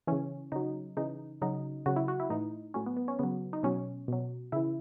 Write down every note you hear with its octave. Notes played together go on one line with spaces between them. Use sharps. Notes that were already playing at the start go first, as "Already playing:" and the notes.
C#3 E3 C#4
C#3 F#3 D#4
C#3 E3 D#4
C#3 F#3 D#4
C#3 F#3 F#4
E4
F#4
E4
A2 E3 D#4
A2 F#3 C#4
B3
B3
C#4
C#3 F#3 B3
D#4
B2 F#3 C#4
B2 F#3
C#3 E3 E4